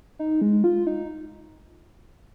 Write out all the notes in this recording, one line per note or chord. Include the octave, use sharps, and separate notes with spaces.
D#4
G#3
F4
D#4